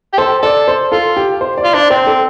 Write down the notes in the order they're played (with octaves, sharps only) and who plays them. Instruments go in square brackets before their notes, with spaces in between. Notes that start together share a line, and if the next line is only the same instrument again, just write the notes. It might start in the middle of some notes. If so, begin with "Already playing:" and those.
[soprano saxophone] G4
[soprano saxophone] A4 [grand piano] C5
[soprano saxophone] A4 [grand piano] D5
[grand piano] C5
[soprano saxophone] F4 [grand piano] A4
[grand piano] G4
C5
D5
[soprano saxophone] F4
[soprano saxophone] D4 [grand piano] C5
[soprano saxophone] C4 [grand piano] C5
[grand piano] A4